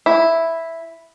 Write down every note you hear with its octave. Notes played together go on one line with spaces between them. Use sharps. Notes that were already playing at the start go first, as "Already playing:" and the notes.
E4